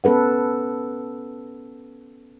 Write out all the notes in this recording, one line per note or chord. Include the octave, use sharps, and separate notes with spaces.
B3 C#4 A4 B4 F#5